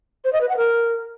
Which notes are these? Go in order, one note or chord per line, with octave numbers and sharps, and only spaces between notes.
C5
D#5
B4
F#5
A#4